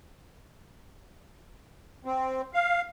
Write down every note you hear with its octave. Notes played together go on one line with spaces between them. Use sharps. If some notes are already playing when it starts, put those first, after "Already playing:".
C4
F5